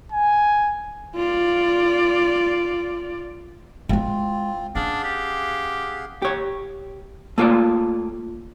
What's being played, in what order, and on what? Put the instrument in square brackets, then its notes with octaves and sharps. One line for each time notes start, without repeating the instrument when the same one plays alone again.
[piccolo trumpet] G#5
[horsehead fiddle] F4 D5
[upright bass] G#3 E4 [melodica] C4 F4
[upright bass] C#4 [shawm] D4 [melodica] G#4 F5 F#5
[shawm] G4
[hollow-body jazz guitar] G4 C#5
A3 A#3 F4 C#5 D5